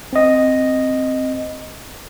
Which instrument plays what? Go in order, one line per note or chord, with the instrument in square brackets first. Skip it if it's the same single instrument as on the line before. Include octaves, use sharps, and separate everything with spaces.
[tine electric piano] C4 D#5